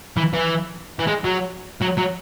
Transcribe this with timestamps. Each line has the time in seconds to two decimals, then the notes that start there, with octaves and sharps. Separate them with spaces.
0.17 E3
0.34 E3
0.99 E3
1.07 G#3
1.24 F#3
1.82 F#3
1.98 F#3